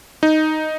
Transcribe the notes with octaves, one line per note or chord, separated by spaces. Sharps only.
D#4